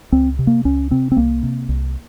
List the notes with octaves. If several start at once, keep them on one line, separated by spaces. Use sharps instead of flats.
C#2 C4
C3
A#3
C#2 C#4
C3 C4
C4
C2 A#3
C3
C2